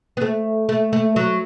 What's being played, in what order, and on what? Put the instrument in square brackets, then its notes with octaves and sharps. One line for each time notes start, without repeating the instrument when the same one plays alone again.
[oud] B3
A3
A3
A3
F#3